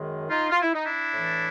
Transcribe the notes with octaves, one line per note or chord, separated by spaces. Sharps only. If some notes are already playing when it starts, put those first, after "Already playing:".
Already playing: F#2 D#3 G#3
D#4 F4
F4
E4
D#4
D4 E4
A2 E3 A3